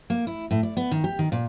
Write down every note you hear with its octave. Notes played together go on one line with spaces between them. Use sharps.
A#3
E4
A2
D5
B3
D#3
G4
D#3
A#2